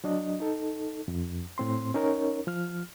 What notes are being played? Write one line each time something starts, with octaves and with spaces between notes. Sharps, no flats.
F#3 D4 D#5
D#4 A4
F2
A2 C4 C6
C#4 D#4 A#4 C#5
F3 F6